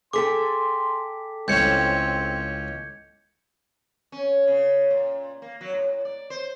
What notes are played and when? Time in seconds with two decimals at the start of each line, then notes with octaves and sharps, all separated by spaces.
0.13 G#4 A4 G5 C6 D6 B6
1.48 C#2 A2 C4 C#4 G6 G#6 C#7
4.12 C#4
4.47 C#3
4.90 A#2
5.42 A#3
5.61 F#3
5.73 A2
6.05 D5
6.30 C5